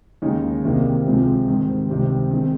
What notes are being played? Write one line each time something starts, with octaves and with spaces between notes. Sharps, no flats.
D#2 C#3 G#3 D#4
C2 C3 D#3 G3 A#3
C#2 C3 F3 G#3 C4
G#2 D#3 G3 C4 G4
C#2 C3 D#3 G3 C4
D#3 G#3 C4